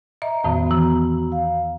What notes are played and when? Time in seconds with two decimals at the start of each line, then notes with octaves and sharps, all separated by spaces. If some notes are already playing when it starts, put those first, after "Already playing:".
0.22 D#5 E5 A#5
0.44 E2 A2 D#3 B3 F#4 A#5
0.71 E3
1.32 F5